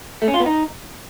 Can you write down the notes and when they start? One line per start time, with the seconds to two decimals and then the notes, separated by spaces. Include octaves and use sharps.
0.22 A3
0.28 C#4
0.34 F4
0.40 B3
0.46 D#4